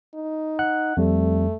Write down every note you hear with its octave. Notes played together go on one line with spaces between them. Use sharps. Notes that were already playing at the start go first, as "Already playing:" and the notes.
D#4
F#5 F#6
F2 G3 A3